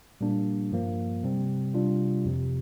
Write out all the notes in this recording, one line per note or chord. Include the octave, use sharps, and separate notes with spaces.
A#2 G3 A#3 D4
G2 F3 A#3
C3 G3 C4
C3 G3 D4 F4
F2 C3 F3